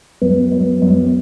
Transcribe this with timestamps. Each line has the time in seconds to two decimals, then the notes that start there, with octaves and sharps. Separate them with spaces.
0.22 F#2 B3
0.52 F#2
0.82 F#2